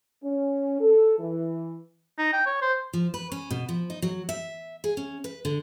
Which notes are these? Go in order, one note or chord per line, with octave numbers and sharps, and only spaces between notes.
C#4
A4
E3
D#4
G5
C#5
C5
F3
B4
C#4
B2
F3
D#4
F#3
E5
G#4
C#4
B4
D3